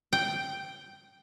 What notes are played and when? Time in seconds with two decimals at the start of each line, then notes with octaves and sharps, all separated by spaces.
0.13 G5